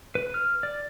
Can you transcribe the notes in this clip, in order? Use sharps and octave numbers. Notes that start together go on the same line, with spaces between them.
B4
F6
D5